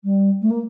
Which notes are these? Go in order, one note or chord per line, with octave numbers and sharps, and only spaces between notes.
G3
A3
A#3